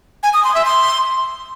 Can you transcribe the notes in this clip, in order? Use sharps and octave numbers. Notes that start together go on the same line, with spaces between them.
G#5
D#6
C6
E5
C6